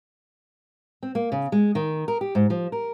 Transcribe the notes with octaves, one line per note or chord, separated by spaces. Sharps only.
C4
A#3
C#3
G#3
D#3
A#4
G4
G#2
F3
A#4